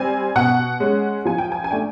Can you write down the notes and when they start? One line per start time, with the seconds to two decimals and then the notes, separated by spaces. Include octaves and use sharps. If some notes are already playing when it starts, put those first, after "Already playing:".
Already playing: G3 C4 G#5
0.35 B2 F#5
0.80 G#3 C#4
1.25 F3 G#5
1.38 G5
1.52 G#5
1.64 G#5
1.71 A3 D4 G5